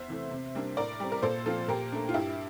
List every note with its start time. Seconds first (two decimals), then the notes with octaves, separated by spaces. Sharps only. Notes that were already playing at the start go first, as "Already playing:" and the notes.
Already playing: E2 C5 E5
0.08 C3 E3 A3
0.31 C3
0.55 G3 A#3 D4
0.77 A2 A#4 D5
1.00 G3 C4
1.12 A#4
1.23 A#2 A4 C5
1.46 F3 C4 F4 A4
1.68 A#2 G4 A#4
1.92 A3 D4
2.09 F4
2.14 G2 E4 G4